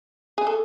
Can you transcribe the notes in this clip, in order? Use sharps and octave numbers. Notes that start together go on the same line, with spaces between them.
G#4
A4